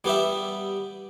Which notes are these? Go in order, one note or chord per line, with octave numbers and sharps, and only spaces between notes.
G3 B3 G4 E5